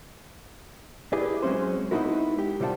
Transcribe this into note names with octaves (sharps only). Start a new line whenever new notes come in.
E4 G4 G#4 B4 D5
F#3 G#3 C4 C#4 C5
G#3 B3 D#4 E4 F#4 A#4
G4
C3 G3 F4 F#5 A5